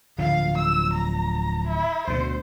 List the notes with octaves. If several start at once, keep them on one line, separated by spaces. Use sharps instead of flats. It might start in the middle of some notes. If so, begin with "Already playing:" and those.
D1 D3 F3 F5
E6
A#5
E4
D2 B2 C5